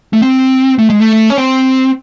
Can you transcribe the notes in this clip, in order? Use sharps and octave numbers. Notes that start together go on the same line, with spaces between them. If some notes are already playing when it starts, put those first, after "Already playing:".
A3
C4
A3
G#3
A3
C#4
C4